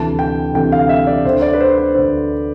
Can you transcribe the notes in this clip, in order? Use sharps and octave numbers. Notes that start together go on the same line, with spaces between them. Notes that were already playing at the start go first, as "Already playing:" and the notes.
Already playing: D2 C3 E3 A5
G5
D2 C3 E3 G5
F5
E5
D5
D2 D3 C5
D5
B4
C5
C5
D2 D3 C5